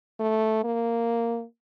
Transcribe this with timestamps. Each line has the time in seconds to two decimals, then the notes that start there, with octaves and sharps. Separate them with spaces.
0.20 A3
0.64 A#3